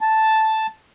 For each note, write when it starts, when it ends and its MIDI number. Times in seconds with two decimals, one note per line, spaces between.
0.01 0.67 81